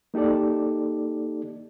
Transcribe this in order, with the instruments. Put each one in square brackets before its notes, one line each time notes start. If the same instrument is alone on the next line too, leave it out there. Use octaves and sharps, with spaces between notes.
[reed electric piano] A#3 D#4 G4 A4 D5